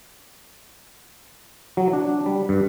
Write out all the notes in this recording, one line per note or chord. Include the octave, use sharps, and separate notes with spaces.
F#3
D4
G3
G2